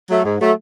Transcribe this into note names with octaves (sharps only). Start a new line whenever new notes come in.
F#3 A3
G#2
F#3 A3